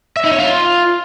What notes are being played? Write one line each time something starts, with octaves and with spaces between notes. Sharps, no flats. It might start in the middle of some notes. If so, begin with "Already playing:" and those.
E5
D#4
C#5
F4